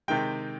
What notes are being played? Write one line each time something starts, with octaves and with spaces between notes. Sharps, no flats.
C3 D#3 G#3 G5